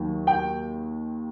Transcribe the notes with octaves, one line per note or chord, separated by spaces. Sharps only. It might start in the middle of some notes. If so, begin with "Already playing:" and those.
Already playing: D#2 D#3 F#3
G5